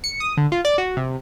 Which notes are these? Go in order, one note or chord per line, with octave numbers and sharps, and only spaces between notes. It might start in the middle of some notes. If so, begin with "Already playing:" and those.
C#7
D#6
D3
F4
D5
F#4
C3